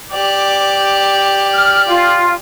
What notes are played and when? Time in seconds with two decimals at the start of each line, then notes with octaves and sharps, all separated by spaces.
0.13 G4 D5
1.53 F6
1.88 F4